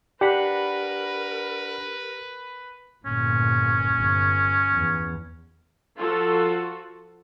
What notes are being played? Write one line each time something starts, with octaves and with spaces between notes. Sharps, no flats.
D4 G4 A#4 B4 F#5 B5
G1 A#2 C#4
G1
E2
F3 F4 F#4 A4